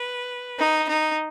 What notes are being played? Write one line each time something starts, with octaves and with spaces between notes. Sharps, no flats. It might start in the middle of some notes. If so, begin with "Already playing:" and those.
Already playing: B4
D#4
D#4